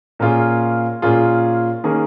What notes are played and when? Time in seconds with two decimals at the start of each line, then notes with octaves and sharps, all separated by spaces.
0.19 A#2 A#3 C#4 F4 G#4
1.02 A#2 A#3 C#4 F4 G#4
1.84 D#3 A#3 C#4 G#4